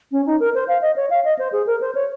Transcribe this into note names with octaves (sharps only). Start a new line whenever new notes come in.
C#4
D#4
A#4
C5
F5
D#5
C#5
F5
D#5
C5
G#4
A#4
C5
C#5